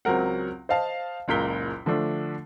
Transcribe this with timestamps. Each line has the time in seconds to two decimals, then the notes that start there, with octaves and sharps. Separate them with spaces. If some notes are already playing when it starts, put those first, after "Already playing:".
0.05 C#2 F#3 C4 A#4 F#5
0.69 C5 D#5 F5 A5
1.28 F#1 C#2 A#2 A#4 B6 G7
1.86 D3 F3 A3 D4